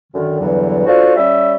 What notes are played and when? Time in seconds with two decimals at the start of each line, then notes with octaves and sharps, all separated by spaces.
0.13 F#2 D3 D#3
0.39 E2 G2 D3 E3 F#3
0.85 D4 F4 F#4 A4 C5
1.15 G3 C#4 G4 E5